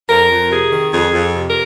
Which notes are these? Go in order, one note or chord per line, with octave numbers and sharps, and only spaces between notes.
F2 A#4
F2
C3 G#4
D#3
F2 G#4
F2
C3
A#4